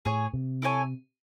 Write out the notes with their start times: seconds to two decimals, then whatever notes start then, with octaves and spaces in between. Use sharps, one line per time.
0.05 A2 G#4 C#5 G#5
0.34 C3
0.62 E4 A4 C#5 G#5